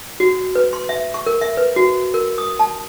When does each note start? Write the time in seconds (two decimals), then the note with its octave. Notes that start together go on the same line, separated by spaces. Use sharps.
0.20 F#4
0.55 B4
0.73 C6
0.89 E5
1.14 C#6
1.26 A#4
1.41 E5
1.57 B4
1.76 F#4
2.14 A#4
2.38 D#6
2.59 A5